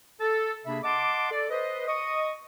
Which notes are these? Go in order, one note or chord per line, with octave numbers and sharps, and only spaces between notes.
A4
C3 A#3 D4 G#4 E5 B5
D#5 F#5 A5 C6 D6
A4 D5
B4 C5 D#5
D#5 C#6 D#6